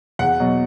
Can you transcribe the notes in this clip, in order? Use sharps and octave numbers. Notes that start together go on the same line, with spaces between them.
E2 F#5
B2 F#3